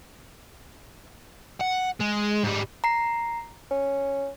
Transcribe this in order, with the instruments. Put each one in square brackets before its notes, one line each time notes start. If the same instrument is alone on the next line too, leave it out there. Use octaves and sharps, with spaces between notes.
[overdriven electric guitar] F#5
G#3
G#2 G3
[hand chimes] A#5 C7
[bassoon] C#4